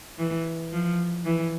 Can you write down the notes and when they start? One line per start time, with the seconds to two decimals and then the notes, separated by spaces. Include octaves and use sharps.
0.19 E3
0.73 F3
1.25 E3